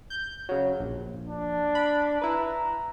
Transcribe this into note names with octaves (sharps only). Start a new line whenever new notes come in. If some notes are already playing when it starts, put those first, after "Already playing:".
G6
C#3 F#3
A#1
D4
B5
E4 B4 A#5